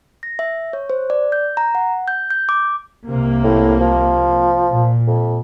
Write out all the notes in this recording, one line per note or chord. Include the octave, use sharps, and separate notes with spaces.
A#6
E5
C#5
C5
D5
G6
A#5
F#5
G6
G6
D6
C2 C3 A#3
A2
F3
A#2
F2